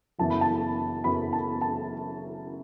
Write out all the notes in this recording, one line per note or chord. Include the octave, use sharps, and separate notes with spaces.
F#1 F#2 E3 B3 A5
B5
A5
F#1 F#2 E3 B3 B5
A5
A5